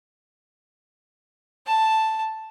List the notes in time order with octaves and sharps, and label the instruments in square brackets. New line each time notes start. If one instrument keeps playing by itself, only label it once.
[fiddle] A5